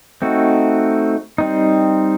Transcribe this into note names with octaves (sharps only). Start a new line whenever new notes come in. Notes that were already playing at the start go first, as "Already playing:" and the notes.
A3 C4 D#4 F#4
G3 C4 D#4